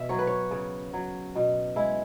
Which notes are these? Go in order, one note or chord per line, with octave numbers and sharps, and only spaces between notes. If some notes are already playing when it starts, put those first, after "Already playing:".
Already playing: B2 E5
F#3 C#5
B4
C#5
C#3
F#3
B2
G#3 E4